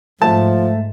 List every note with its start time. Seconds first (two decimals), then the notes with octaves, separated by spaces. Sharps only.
0.22 G#2 F3 A3 A5